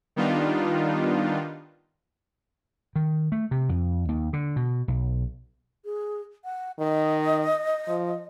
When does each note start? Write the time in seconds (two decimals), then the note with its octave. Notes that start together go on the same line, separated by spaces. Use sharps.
0.16 D#3 G3 B3 D4 D#4 F4
2.96 D#3
3.32 A3
3.51 C3
3.69 F2
4.09 D#2
4.33 D3
4.56 B2
4.88 B1
5.85 G#4
6.45 F#5
6.79 D#3 D#5
7.88 F3